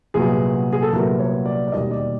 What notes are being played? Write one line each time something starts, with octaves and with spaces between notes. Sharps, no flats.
C2 A#2 F#3 B3 G#4
G#4
A4
C2 A#2 F#3 B3 A#4
C#5
D5
D5
E1 D#2 D#3 G3 A#3 D#5
D5